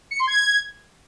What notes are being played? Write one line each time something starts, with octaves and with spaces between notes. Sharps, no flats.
C#7
C6
G#6